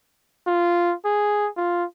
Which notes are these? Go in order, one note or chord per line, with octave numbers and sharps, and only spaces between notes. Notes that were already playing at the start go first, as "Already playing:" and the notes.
F4
G#4
F4